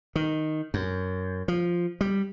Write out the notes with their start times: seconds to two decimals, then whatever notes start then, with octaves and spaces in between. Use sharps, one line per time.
0.16 D#3
0.74 F#2
1.48 F3
2.01 G3